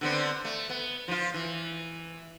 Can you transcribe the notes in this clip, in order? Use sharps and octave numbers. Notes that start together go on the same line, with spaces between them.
D3 B3 C4
A3
B3
F3 F4
E3